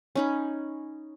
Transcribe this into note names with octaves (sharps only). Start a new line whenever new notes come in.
C#4 D#4 B5